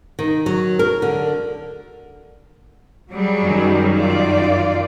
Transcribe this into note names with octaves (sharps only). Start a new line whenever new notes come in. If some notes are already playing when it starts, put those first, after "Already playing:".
D#3
F#3
A#4
D3
F#3 G3 G#4
F#2 D#3
F4 D5